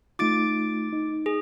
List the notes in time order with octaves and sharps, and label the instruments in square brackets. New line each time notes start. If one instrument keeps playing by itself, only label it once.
[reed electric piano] A3 D#4 F4 [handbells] D6 A6 D7
[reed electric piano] D#4
[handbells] G#4